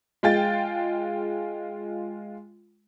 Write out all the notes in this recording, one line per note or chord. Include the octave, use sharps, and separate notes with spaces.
G#3 F4 G5 A6